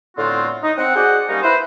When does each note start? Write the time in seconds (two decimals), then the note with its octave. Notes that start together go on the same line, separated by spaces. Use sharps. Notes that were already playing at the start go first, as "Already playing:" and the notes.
0.17 A2 D3 B3 C4 F4 F#4
0.63 D#4
0.78 C4 F#5
0.95 F#4 G#4 C5 D5 D#5 F#5
1.28 G3 A#3 C#4 D#4
1.42 E4 B4 C5